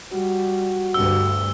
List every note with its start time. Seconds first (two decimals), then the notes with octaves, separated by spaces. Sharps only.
0.13 G3 F#4
0.94 D2 G2 E6